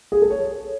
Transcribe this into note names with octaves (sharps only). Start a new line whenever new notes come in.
G#4
A4
C#5